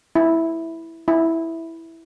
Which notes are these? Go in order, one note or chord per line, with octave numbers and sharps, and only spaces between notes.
E4
E4